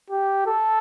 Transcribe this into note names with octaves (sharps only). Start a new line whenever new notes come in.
G4
A4